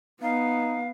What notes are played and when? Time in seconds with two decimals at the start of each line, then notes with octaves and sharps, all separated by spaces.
0.22 B3 D#4 F5